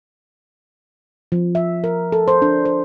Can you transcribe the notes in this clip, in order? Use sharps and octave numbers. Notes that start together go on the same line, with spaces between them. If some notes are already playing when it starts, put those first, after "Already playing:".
F3
E5
A#4
A4
C5
D4
C5